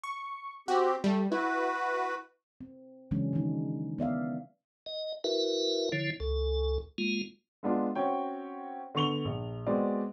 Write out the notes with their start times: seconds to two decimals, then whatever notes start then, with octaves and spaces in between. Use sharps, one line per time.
0.04 C#6
0.68 C4 F#4 G4
1.04 G3 A3
1.32 E4 F#4 B4
2.61 C4
3.11 C#3 E3 F#3 G#3 C#4 D4
3.33 D#3 E3 A#3 D4 D#4
3.99 B3 D5 E5 F5
4.86 D#5
5.24 E4 F#4 A#4 B4 E5
5.92 D3 F3 E4 C#5
6.20 C#2 A4
6.98 G#3 A#3 F4
7.63 G#3 B3 D4 F4
7.95 C4 C#4 F#4 C#5 G5
8.95 D3 B3 C#6 F7 G7
9.25 A#1
9.67 G#3 B3 C4 F#4 D5